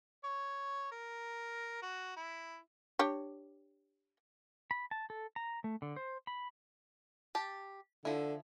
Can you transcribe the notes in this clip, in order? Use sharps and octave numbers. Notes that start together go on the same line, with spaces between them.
C#5
A#4
F#4
E4
D4 G4 C#5
B5
A5
A4
A#5
A3
D3
C5
B5
G4 A5
D3 F3 E4